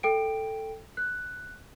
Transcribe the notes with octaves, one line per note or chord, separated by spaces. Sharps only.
A4 G5 D7
F#6